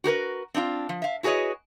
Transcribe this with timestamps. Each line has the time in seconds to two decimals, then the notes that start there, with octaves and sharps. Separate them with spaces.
0.04 F#4 G4 A#4 B4
0.54 C4 D4 D#4 F4
0.89 F3
1.02 E5 F5
1.23 E4 F#4 G#4 B4 C#5 D#5